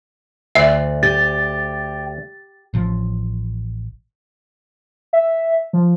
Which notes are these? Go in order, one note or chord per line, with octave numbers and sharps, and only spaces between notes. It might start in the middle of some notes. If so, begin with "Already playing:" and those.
D2 D5 E5
G4 A6
A1 F3
E5
F3